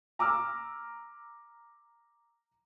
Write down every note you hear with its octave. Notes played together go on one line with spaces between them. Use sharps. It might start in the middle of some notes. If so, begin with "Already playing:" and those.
A#5 D6 E6 F6